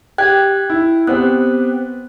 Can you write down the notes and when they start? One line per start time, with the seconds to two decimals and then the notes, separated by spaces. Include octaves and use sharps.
0.18 G4 G5 F#6 G#6
0.70 E4
1.07 B3 C4 G4 F#6